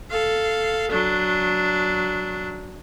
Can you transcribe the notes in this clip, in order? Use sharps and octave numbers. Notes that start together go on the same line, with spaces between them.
A4 F5
F#3 D4